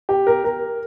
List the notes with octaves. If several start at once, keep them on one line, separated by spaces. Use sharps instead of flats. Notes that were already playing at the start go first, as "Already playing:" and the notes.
G4
A#4
A#4